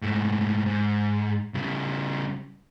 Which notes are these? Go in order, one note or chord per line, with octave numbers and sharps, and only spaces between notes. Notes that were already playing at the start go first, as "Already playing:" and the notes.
G#2 A3
G#2
C#3 G3